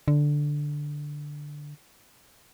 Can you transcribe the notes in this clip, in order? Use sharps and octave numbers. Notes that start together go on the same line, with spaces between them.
D3